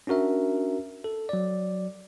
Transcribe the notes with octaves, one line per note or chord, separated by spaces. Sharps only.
C#4 D4 F#4 A#4 E5
A4
F#3 D5